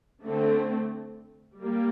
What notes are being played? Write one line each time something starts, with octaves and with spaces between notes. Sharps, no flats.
D3 A3 C4
G3 A#3